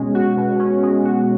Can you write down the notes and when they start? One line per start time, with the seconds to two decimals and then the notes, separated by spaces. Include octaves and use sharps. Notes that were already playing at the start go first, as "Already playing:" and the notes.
Already playing: B2 G#3 C#4
0.14 F#4
0.37 B2
0.59 C#4
0.83 G#3
1.05 F#4